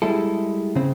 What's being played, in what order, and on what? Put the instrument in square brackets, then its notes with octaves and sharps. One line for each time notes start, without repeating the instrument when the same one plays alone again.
[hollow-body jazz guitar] G3 G#3 E4 A4
C#3 C4